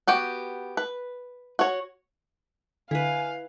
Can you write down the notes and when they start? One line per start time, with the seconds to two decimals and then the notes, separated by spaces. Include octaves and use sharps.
0.07 B3 F#4 G4 G5
0.77 B4
1.59 F#4 C#5
2.91 D3 E4 B4 F5 G#5